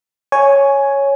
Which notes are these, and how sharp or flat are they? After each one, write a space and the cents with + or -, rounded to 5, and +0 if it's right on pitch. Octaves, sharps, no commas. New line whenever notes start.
C#5 +0 G#5 +5